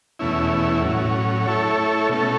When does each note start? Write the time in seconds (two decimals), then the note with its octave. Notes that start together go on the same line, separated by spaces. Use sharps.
0.19 E2 B2 A3 C#4 E4
0.83 A2 F#3 C#4
1.46 A3 E4 A4 C#5
2.09 B2 A3 C#4 A4